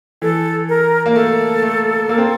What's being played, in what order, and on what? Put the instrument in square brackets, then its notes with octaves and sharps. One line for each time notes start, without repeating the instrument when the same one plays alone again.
[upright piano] E3 [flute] A4
[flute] A#4
[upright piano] A#3
[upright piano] A3 [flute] A4
[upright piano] A3
A#3
C4